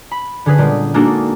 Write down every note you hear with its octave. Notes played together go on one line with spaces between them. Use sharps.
B5
D3 C#4 G#4 B4
A#2 G3 G#3 B3
G#3 A#3 D4 D#4 F#4 A4